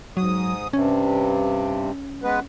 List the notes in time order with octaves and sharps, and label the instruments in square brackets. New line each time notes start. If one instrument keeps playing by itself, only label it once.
[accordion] G#2 D#6 [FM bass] F#3
[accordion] G2 C3 [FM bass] C#4
[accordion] G#3 B3 B4